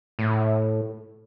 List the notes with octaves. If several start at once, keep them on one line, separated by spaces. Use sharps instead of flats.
A2